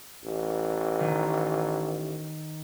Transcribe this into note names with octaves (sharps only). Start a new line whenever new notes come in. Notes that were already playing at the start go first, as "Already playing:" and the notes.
A1
D#3